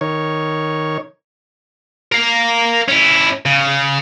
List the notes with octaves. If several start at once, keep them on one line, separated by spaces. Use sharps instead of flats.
D#3 C#5
A#4 F5
C#4 E4
C#3